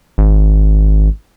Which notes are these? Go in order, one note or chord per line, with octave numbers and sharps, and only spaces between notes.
G#1